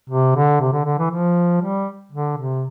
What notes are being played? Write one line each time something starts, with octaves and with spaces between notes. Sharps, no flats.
C3
D3
C3
D3
D3
E3
F3
G3
D3
C3